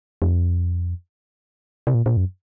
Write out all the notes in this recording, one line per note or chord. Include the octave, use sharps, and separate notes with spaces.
F2
C3
A#2
A#2
F#2